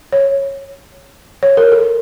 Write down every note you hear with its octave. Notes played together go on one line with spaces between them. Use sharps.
C#5
C#5
A#4
A4